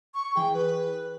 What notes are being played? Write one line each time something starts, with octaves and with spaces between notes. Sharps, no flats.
C#6
E3 G#4 G5
B4